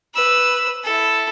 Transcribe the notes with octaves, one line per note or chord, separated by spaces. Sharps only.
B4 E6
E4 A4